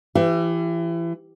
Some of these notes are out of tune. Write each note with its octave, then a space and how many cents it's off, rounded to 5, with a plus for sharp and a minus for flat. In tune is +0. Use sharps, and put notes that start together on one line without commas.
E3 +30 G4 +0 E5 +35